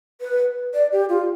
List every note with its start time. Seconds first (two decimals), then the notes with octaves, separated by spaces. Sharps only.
0.21 B4
0.74 D5
0.92 G4
1.09 F4